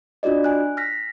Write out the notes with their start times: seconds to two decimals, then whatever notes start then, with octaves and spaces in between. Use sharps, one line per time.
0.23 D4 F4 F#4 D5 D#5
0.44 G#5 F#6
0.77 F6 A#6 B6